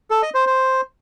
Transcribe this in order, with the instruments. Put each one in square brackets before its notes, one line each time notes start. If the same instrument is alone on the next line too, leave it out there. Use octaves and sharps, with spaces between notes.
[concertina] A4
D#5
C5
C5